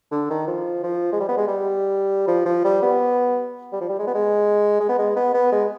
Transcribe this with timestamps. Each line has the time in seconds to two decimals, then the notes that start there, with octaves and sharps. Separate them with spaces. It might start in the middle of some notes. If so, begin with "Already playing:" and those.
0.11 D3
0.30 D#3
0.47 F3
0.83 F3
1.12 G#3
1.20 G3
1.29 B3
1.37 G#3
1.47 G3
2.27 F3
2.46 F3
2.64 G3
2.82 B3
3.72 G3
3.81 F3
3.89 G3
3.99 G#3
4.07 B3
4.14 G#3
4.80 G#3
4.89 B3
4.99 G#3
5.16 B3
5.34 B3
5.52 G#3